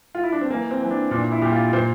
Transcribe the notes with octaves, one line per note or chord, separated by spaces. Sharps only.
F4
E4
D4
C4
E3 A#3
C4
E3
D4
A#2 D4
E4
A#2 G4
F4
A#2 C5